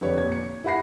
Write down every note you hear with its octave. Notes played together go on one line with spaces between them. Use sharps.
F1 D3 G4 B4 C#5
A#2 G#6
C#7
E4 G4 F#5 B5 A#6 C7